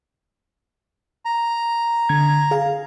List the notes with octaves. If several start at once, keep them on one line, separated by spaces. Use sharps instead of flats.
A#5
D3 G#6
G#4 F5